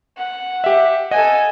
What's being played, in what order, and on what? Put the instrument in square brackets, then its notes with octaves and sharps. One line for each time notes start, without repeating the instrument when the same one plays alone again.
[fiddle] F#5
[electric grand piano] G4 E5
[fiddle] A4 G#5 [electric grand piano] D#5 F#5